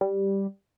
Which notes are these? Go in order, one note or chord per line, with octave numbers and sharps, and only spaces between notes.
G3